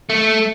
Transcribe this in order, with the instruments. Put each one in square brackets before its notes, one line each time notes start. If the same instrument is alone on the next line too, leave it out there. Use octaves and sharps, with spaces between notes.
[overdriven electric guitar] A3